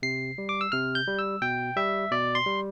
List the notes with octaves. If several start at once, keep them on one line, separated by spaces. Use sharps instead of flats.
C3 C7
G3
D6
E6
C3 F6
G6
G3
E6
B2 G5
G3 E5
B2 D5
C6
G3